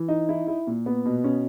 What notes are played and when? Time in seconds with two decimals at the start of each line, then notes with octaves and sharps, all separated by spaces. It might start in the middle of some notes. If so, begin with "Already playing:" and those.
Already playing: E3
0.08 D#4
0.29 E4
0.48 E4
0.67 A#2
0.86 B3
1.05 B2
1.24 C#4